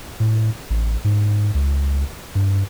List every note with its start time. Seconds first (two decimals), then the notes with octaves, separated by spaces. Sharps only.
0.20 A2
0.70 A1
1.04 G#2
1.54 C#2
2.35 G2